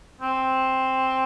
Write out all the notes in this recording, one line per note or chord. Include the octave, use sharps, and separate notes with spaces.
C4